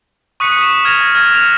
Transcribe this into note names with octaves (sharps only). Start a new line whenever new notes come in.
C#6 D#6 F#6 B6 C#7 D#7
D#6 B6 E7
F6 G#6 A#6 F7
F6 G#6 A#6
F7